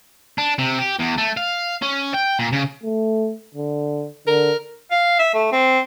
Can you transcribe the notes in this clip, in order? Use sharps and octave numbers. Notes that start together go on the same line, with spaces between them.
D4
C3
G4
E2
A3
F5
C#4
G5
A#2
C#3
A3
D3
D3 A#4
F5
E5
A3
C4